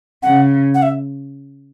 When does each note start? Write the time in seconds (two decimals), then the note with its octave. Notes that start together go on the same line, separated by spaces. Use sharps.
0.23 C#3 F#5
0.74 F#5
0.82 E5